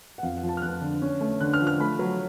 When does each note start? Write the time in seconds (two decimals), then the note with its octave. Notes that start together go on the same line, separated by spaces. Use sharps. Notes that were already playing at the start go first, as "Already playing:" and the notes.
0.18 F#5
0.23 F2 F5
0.37 F#5
0.43 F3
0.49 A5
0.57 F6
0.62 F2 F#6
0.81 D3
1.02 C#4
1.21 A3
1.40 D3 F#6
1.54 F6
1.61 F3
1.67 F6
1.80 A3 B5
1.99 F#3